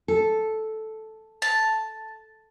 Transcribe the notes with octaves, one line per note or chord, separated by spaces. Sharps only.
A4
A5